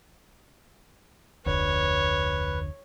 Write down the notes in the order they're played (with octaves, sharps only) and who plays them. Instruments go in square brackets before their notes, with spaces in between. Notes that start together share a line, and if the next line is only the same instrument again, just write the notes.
[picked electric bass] F1 D2 [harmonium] B4 [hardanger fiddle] C#5